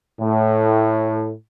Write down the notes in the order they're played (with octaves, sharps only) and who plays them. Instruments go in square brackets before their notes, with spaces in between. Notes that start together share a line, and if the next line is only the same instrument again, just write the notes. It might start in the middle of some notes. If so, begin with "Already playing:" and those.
[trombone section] A2